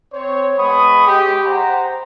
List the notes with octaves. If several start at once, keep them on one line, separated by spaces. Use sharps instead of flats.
C4 C5 C#5
G#3 B3 B5 C#6 D#6
G#3 G4
C5 F#5 G5 A#5